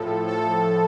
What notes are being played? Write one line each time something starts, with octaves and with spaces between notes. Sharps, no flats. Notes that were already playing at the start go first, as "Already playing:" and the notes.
Already playing: A2 F3 A4
A4